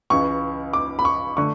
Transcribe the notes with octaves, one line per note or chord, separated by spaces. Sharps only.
C#2 C#3 E3 C#6
D6
B5
C#6
D3 A3 C#6